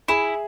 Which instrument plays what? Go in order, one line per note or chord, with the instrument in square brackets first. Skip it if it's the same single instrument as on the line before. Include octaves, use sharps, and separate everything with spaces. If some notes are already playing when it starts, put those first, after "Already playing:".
[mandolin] E4 [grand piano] G#4